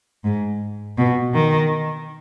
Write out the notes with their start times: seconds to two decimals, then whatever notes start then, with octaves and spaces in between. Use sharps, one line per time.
0.24 G#2
0.98 B2
1.34 D#3